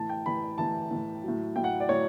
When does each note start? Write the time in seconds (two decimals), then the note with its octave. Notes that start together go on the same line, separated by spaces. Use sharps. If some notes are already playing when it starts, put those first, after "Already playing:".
Already playing: A2 E3 A5
0.09 G5
0.26 A2 E3 B5
0.58 A2 E3 A5
0.91 A2 E3
1.23 A2 F#3
1.56 A2 F#3 G5
1.64 F#5
1.80 D5
1.89 A2 F#3 C#5